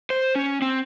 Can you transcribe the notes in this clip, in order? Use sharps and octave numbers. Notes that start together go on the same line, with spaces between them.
C5
C#4
C4